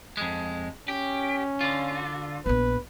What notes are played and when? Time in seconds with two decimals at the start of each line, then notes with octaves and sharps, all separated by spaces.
0.17 F2 G#3
0.88 C#4 G4
1.61 D3 F4
2.46 A#1 B3 B4